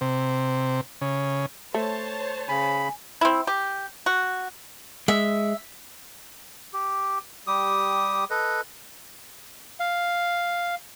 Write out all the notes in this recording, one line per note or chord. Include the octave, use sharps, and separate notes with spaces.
C3
C#3
A3 C5 C#5 A5
C#3 G#5 B5
C4 E4
G4
F#4
G#3 E5
G4
G3 G4 D#6
A4 B4 D#5
F5